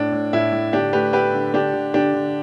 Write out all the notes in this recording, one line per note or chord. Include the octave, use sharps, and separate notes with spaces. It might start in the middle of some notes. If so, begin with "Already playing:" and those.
Already playing: A2 D4
A2
A2 E4
A2
D3 D4 G4
A3 G4 B4
A3 G4 B4
D3
D3 D4 G4
D3
D3 D4 G4
D3